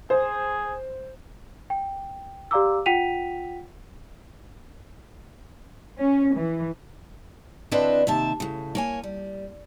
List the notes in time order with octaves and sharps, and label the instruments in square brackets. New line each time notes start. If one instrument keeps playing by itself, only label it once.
[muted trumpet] G#4 [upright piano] C5
[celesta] G5
G4 D5 F5 A#5 D6 E6
F4 F#5 G5 B6 D#7 F7
[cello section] C#4
E3
[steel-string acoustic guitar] D3 C4 D4 E4 B4 D#5
D#2 C3 E5 A5
A2 C#3
A#3 C#5 G#5
G3